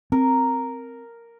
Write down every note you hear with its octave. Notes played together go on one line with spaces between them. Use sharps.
C4 A#4